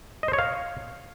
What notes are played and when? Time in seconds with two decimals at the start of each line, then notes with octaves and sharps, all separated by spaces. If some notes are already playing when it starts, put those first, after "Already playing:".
0.23 D#5
0.28 C5
0.33 C#5
0.38 F5